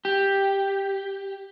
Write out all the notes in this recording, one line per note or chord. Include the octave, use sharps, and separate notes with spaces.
G4